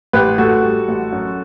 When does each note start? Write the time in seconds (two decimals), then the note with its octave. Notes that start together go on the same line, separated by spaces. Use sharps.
0.13 A1 G4 B4
0.38 A2 F#4 A4
0.63 G3
0.88 A1
1.12 F#2